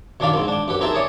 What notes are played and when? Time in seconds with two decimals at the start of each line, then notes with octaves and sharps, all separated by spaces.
0.20 F#2 D#3 D4 D5 F5 B5
0.34 G#2 C4
0.48 D4 G5
0.68 F#2 G4 B4
0.81 C4 D#4 G#4 A#4 E5 A5
0.95 G#4 C#5 D5